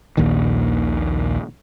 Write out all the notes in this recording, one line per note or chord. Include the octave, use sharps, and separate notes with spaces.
A#1 D#2 A#2 D#3